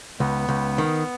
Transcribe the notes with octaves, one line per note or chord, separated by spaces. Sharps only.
C#2 B3
C#2
D#3